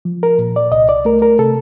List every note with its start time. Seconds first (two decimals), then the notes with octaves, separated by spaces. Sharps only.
0.05 F3
0.23 A#4
0.38 A#2
0.56 D5
0.72 C2 D#5
0.89 D5
1.05 A3 A#4
1.22 A#4
1.39 C3 A4